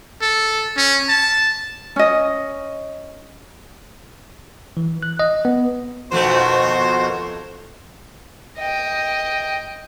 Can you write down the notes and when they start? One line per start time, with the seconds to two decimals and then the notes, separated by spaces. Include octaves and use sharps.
0.21 A4
0.77 C#4
1.09 A5
1.96 C#4 D#5
4.77 E3
5.03 F#6
5.19 D#5
5.45 B3
6.12 F2 B2 D#3 F3 A3 F#4 C5
8.58 D#5 G5